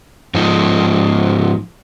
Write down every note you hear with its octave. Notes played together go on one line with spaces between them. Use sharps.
G#2 F3 D#4